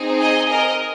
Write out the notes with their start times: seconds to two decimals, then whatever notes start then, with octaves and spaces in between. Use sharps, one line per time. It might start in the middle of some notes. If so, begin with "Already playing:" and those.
Already playing: C4 D#4 G#4
0.19 D#5 G#5
0.49 A#4 D#5